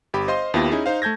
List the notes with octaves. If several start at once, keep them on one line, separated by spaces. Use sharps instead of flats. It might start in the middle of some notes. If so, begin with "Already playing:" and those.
G1 G4 G5 B5
C5 D#5 F5 C6
D#2 B3 E4 F4 G4 A#6
C#4 D#4 E4 G#4
D#4 C5 F5
A3 A5 G6 G#6 A#6